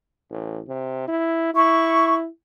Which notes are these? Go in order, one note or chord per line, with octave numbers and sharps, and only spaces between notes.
A1
C3
E4
E4 C#6